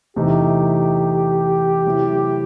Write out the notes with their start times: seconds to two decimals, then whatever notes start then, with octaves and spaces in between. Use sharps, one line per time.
0.16 E2 C3 E3 A3 D#4 G4
1.86 C3 F#3 A3 E4